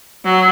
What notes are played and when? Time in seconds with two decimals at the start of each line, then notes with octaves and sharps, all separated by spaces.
0.25 F#3